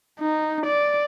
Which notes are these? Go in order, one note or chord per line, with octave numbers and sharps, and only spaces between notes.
D#4
D5